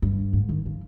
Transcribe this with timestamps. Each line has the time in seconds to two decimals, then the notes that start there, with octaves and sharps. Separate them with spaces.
0.02 G2
0.33 G#2
0.49 D#3
0.66 F3